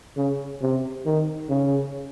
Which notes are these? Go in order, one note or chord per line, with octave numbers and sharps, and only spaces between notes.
C#3
C3
D#3
C#3